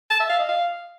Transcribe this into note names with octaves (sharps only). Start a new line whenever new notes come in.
A5
E5
F5
D#5
F5